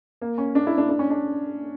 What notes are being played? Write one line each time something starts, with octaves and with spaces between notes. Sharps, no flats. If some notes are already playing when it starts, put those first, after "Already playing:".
A#3
C#4
D4
E4
D4
D4
C#4
D4